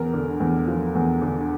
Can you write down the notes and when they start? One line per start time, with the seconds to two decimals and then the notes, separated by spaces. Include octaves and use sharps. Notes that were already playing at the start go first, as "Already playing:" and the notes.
Already playing: E2 A#4
0.14 D3
0.40 E2
0.67 F3
0.95 E2
1.22 D3